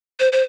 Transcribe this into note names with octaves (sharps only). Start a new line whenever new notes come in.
C5
C5